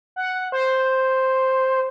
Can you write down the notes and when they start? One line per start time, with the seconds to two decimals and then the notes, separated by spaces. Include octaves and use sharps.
0.16 F#5
0.52 C5